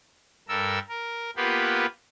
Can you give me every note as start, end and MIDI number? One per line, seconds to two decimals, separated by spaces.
0.48 0.79 43
0.48 0.79 69
0.48 0.79 70
0.48 0.79 88
0.88 1.30 70
1.36 1.86 58
1.36 1.86 59
1.36 1.86 65
1.36 1.86 67
1.36 1.86 71